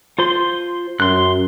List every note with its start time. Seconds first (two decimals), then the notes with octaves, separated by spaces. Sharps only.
0.19 F4 C5 C6
1.00 F#2 C6 F#6